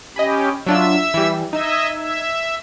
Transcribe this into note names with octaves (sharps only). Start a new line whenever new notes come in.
C#4 G4 D#5 G#5 B5
F#3 D4 F4 E5 E6
E3 G3
D#4 D#5 E5 E6 G#6
E5